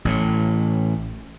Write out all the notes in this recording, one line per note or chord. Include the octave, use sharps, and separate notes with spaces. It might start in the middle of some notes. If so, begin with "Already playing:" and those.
A1 A2